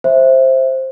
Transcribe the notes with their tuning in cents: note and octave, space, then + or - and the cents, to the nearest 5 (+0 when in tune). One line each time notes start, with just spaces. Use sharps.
C5 +10 E5 +0